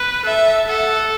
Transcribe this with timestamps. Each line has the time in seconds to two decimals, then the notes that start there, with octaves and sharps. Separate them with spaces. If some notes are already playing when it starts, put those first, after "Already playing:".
Already playing: B4
0.25 A4 E5
0.68 A4 F#5